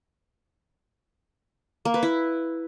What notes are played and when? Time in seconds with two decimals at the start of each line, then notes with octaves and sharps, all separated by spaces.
1.85 A#3
1.94 B4
2.03 E4